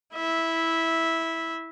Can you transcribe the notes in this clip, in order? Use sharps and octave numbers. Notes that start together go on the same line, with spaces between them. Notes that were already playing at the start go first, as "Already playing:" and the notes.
E4 E5